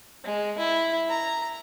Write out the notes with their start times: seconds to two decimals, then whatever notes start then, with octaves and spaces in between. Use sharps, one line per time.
0.24 G#3
0.58 E4
1.09 A#5